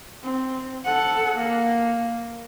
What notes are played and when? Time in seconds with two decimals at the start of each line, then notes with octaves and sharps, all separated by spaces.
0.24 C4
0.85 A4 F#5
1.37 A#3